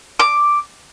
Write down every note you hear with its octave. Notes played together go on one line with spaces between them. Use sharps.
D6